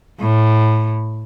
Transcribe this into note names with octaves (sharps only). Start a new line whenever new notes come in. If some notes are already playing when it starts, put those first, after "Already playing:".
A2